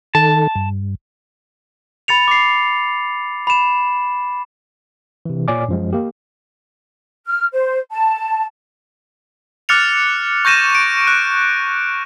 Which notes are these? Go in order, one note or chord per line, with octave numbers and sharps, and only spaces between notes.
D#3 A4 A5
G2
B5 A6 C#7 F7
D6 C7
B5 E7
C3 E3
A#2 C#5 D5 G#5 D6
F#2 F3 G#3
A#3 G4
F6
C5
A5
D6 F6 F#6 A6 C#7 F7
C#6 G6 A#6 D#7 E7
D7 D#7
F#6